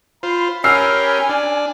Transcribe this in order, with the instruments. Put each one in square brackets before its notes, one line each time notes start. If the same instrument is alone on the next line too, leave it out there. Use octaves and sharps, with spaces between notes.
[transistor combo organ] F4 C5 [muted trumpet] B5
[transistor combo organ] C#4 G4 A#4 [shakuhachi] G#5 [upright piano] E6 F6 C7
[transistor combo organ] D4